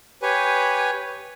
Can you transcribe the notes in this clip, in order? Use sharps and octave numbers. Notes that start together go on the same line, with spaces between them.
G4 B4 C#5 G#5